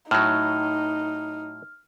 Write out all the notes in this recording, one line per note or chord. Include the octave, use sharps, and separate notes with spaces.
A2 F#3 D#4 F6